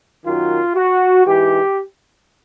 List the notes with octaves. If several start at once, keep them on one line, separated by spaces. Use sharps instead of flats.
F#2 D#3 F#3 F4
F#4
G#2 E3 G4